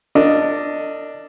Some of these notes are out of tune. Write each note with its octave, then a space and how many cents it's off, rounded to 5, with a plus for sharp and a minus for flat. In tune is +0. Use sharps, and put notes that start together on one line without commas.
D4 +0 A#4 -45 D#5 +0